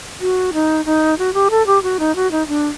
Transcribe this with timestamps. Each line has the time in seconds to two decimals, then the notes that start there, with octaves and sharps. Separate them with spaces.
0.21 F#4
0.54 D#4
0.85 D#4
1.19 F#4
1.34 G4
1.50 A4
1.67 G4
1.83 F#4
2.00 D#4
2.16 F#4
2.32 D#4
2.48 D4